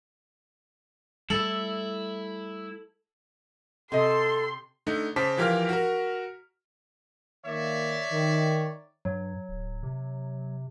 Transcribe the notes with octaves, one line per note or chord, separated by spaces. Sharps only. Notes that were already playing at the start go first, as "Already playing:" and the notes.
G3 A3 E4 A4 F#7
C3 A4 D#5 C6
D3 A3 D#4
C#3 C5 A5 D6 B6
E3 F3 G4 A#4 F5 F6
F#4 A#4
D#3 A#3 C#5 D5 E5
D#3
G2 F#3
D1
C3